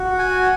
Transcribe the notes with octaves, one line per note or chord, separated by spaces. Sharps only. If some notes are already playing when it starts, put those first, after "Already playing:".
Already playing: F#4
G#5